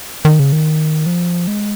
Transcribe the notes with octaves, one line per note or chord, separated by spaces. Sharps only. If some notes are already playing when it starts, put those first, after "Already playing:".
D#3
C#3
D#3
F3
G#3